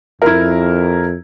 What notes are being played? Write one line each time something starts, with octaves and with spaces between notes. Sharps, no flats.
F2 E4 A#4